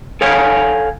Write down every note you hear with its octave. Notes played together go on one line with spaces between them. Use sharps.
A4 C#5 F5 F#5 G#5